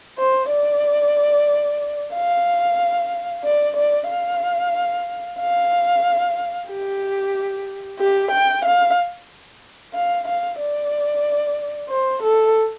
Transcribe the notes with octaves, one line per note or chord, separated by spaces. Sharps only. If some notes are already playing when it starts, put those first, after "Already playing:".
C5
D5
F5
D5
D5
F5
F5
G4
G4
G5
F5
F5
F5
D5
C5
A4